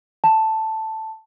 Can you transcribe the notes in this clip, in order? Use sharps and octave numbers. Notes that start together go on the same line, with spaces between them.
A5